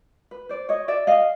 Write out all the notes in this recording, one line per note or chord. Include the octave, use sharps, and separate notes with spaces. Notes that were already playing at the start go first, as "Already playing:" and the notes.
B4
C5 D5
C#5 D#5
D5 E5
D#5 F5